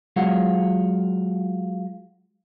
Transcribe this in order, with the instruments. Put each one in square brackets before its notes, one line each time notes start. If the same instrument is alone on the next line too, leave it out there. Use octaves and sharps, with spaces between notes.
[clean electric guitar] F#3 G#3 F4 F#5